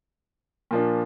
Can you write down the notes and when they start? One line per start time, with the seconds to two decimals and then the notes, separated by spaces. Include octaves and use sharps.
0.71 A#2 F3 A#3 D4